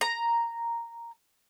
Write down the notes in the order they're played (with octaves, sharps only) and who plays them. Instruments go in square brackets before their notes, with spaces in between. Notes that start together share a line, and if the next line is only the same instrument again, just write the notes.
[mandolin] A#5